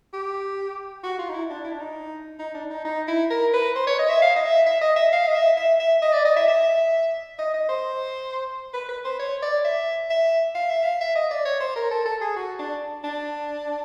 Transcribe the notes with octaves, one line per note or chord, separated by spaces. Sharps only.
G4
F#4
F4
D#4
E4
D4
E4
D4
D#4
D#4
D4
D#4
D#4
E4
A#4
B4
C5
C#5
D#5
E5
F5
D#5
E5
E5
D#5
E5
F5
D#5
E5
E5
E5
D#5
D5
D#5
E5
E5
D#5
D#5
C5
B4
B4
C5
C#5
D5
E5
E5
F5
E5
F5
E5
D#5
D5
C#5
C5
A#4
A4
A4
G#4
F#4
D4
D4